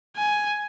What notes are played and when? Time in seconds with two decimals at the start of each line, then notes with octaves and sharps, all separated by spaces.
0.17 G#5